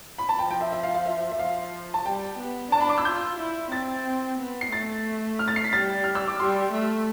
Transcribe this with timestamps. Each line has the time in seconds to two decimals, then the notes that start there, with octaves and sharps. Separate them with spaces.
0.18 B5
0.29 A5
0.39 F3 G5
0.51 G5
0.61 E5
0.72 E5
0.83 F5
0.94 F5
1.06 E5
1.31 E5
1.39 F3 F5
1.94 A5
2.06 G3 G5
2.39 B3
2.72 D4 A5
2.81 B5
2.89 D6
2.98 E6
3.05 F4 G6
3.39 E4
3.72 C4 A6
4.39 B3
4.61 C7
4.72 A3 A6
5.39 F6
5.48 A6
5.56 C7
5.64 B6
5.73 G3 A6
6.04 F6
6.15 E6
6.28 D6
6.40 G3 C6
6.73 A3